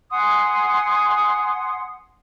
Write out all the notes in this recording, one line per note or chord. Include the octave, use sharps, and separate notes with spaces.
F#5 G#5 C6 D#6